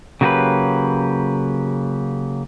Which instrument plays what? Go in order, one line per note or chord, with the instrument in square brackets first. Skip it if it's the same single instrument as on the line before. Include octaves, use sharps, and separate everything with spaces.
[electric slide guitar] C#3 F#3 A#3 F#4 G4 B4